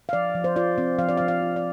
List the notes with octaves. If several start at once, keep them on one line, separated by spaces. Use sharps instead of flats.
F5
F3 D5
F3
C5
F4 D5
C4
F3 F5
D5
F5
F3
F5
F4
D5